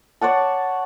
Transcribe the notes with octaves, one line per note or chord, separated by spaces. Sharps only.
C#5 D5 F#5 A5